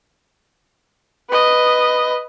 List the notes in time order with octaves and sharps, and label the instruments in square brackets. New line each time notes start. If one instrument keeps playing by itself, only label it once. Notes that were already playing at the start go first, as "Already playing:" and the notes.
[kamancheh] B4 D#5